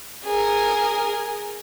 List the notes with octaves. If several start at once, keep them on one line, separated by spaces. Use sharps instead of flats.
G#4 A#4